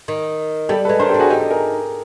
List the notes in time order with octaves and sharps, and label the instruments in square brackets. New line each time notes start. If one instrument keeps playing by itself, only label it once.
[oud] D#3
[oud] G3 [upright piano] G4 A4
[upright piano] A4 B4
[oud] G#3
[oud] D4 [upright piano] A#4 C5
[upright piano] G4 A4
[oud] D4
[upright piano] F#4 G#4
[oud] D#4 [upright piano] G4 A4
[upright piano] G4 A4
G#4 A#4